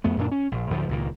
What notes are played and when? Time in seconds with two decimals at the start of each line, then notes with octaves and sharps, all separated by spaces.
0.04 F2 A3 B3
0.17 F#2 A#2 D4
0.32 C#4
0.52 A#1
0.70 D2 A2 F3
0.89 C#2 A#2 D#3